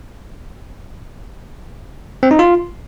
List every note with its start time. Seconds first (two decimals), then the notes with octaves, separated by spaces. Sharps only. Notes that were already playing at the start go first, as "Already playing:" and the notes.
2.23 C4
2.31 D#4
2.39 F4